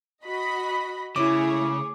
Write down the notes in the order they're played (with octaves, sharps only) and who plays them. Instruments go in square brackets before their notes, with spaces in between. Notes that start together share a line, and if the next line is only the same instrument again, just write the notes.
[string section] F#4 D#5 B5
[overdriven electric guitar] C#3 [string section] A3 G#4 C#5 [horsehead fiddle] E4 [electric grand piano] D6